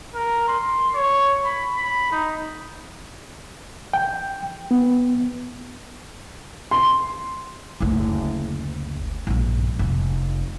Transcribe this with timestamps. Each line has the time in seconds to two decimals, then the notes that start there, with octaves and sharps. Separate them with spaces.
0.15 A#4
0.48 C6
0.95 C#5
1.45 B5
1.76 B5
2.11 D#4
3.93 G5
4.71 B3
6.71 C6
7.80 F#1 D2
9.27 A#1 G2
9.79 F1